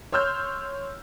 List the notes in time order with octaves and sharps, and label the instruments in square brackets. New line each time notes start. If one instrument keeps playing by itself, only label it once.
[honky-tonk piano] C#5 C6 E6 F6 G6